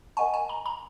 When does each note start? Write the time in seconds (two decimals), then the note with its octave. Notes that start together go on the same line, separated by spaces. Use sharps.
0.17 A#4 D#5 F#5 G#5 C#6
0.34 G#5
0.49 A#5
0.66 A#5